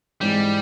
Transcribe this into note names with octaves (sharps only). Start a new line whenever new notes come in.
G#2 E3 G3 G#3